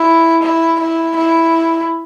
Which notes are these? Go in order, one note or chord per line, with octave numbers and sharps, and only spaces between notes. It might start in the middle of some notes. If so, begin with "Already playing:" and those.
Already playing: E4
E4
E4
E4